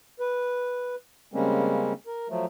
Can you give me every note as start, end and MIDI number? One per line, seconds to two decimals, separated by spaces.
0.20 0.95 71
1.34 1.93 49
1.34 1.93 55
1.34 1.93 56
1.34 1.93 58
1.34 1.93 60
1.34 1.93 61
2.07 2.28 70
2.29 2.45 53
2.29 2.45 54
2.29 2.45 57